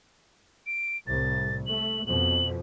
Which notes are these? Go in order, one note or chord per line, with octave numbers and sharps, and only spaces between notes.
D7
C2 A2 A6
A3 F#7
F2 B2 F#7